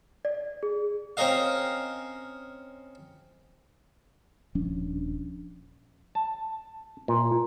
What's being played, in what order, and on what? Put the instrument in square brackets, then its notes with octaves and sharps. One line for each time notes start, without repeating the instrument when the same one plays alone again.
[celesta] D5
G#4
[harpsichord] C4 C#4 A#4 D#5 F5
[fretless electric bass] D#1 F3 C#4 D4
[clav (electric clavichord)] A5
A#2